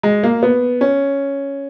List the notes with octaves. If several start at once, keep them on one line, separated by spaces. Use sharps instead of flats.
G#3
A#3
B3
C#4